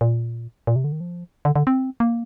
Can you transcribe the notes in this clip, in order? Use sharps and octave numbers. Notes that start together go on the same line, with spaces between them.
A#2
A#2
C3
D3
D#3
F3
D3
D3
C4
A#3